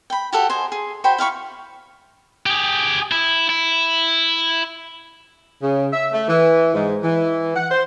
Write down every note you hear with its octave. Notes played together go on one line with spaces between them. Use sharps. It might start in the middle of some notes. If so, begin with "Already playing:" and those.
G5 B5
F#4 G4 A4 F#5
C5 D#5 G#5
G#4
F#4 C5 G5 B5
E4 F5 B5 C#6
G4 G#4
E4
E4
C#3
E5
A3
E3
G#2
E3
F#5
C5